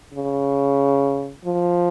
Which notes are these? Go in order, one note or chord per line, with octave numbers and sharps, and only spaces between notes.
C#3
F3